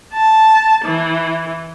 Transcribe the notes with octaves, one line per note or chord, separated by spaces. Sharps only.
A5
E3